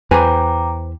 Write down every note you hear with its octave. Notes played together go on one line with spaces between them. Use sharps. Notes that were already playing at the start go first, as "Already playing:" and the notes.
E2 B4 C5 G5 G#5 A#5 D6